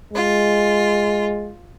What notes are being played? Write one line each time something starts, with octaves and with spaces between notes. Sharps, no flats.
G#3 F4